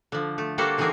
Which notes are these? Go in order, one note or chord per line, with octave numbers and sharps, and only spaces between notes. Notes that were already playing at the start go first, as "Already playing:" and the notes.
D3 F3
A3
G3 A#3 F#4 G4 A4 C5
D3 E3 C4 D#4 G#4 A#4